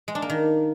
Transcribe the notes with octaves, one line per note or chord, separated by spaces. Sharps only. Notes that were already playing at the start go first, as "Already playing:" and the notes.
G#3
D4
A#3
D#3